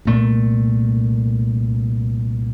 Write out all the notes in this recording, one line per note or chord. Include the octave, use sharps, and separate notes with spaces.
C2 A#2 A3